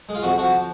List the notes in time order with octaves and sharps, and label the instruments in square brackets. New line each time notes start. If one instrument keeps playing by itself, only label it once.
[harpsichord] G#3
F4
F2 F#4
F3 F#4